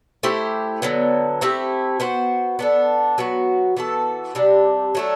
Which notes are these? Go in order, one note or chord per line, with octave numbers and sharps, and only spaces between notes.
A3 E4 G4 C5
D3 F#3 B3
A3 C4 E4 G4
B3 F#4 C5
B3 D4 A4
F#3 B3 F#4
E3 B3 F#4 A4
C3 G3 D4 G4
F#3 A3 D4